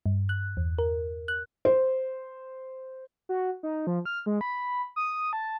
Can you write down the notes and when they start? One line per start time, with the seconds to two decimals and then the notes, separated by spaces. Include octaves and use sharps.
0.06 G2
0.29 F#6
0.57 E2
0.78 A#4
1.28 F#6
1.65 C5
3.29 F#4
3.63 D#4
3.87 F3
4.06 F6
4.26 G#3
4.41 B5
4.96 D#6
5.33 A5